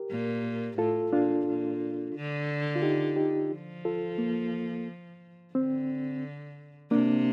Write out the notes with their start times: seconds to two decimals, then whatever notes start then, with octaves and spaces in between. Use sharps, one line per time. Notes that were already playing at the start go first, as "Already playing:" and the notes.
Already playing: G4 A#4
0.11 A#2
0.78 A2 F4 A4
1.13 A#2 D4 F4
1.46 A#2
2.15 D3
2.76 F4
2.82 D#4 G4
3.16 D#4 G4
3.51 F3
3.85 F4 A4
4.18 A#3
5.55 D3 C4
6.91 C3 A#3 D4